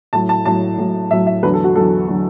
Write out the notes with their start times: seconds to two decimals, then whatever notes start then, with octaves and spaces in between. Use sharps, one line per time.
0.13 A2 F#3 A5
0.29 A5
0.45 A2 F#3 A5
0.78 A2 F#3
1.11 A2 F#3 E5
1.27 E5
1.43 E2 D3 F#3 B4
1.54 A4
1.64 F#4
1.76 E2 D3 F#3 A4
2.08 D3 F#3